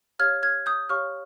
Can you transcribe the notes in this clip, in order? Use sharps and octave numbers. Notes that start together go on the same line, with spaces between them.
G4 C#5 F5 F6 G#6
F6 G#6
D#6 G6
G4 C#5 F5 C#6 F6